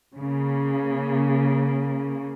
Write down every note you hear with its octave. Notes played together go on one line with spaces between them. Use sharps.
C#3 A#3